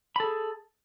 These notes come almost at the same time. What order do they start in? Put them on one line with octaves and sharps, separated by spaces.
B5 A4 G#4